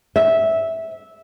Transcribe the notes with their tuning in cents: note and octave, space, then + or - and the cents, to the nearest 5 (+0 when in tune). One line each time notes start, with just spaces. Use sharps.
E5 -10